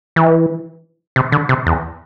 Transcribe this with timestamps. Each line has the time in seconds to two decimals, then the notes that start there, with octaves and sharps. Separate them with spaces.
0.16 E3
1.16 C3
1.32 D3
1.49 C3
1.66 E2